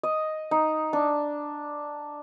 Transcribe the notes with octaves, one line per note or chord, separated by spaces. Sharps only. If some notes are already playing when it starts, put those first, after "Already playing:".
D#5
D#4
D4